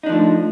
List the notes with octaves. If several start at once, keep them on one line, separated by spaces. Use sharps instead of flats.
F3 A3 D4 D#4